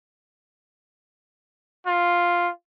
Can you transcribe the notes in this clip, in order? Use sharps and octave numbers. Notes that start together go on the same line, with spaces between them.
F4